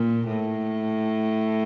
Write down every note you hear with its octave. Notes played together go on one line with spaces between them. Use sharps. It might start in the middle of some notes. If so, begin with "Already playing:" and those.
Already playing: A#2
A2